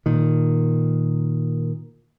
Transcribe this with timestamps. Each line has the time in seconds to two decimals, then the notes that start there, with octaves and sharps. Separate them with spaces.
0.06 A#2 D#3